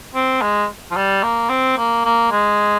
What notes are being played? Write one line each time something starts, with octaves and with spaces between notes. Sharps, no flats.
C4
G#3
F3
G3
A#3
C4
A#3
A#3
G#3